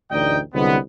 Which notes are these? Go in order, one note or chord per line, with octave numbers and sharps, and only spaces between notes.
A1 D2 D#4 D5 D#5 G5
C2 D3 F#3 G#3 B3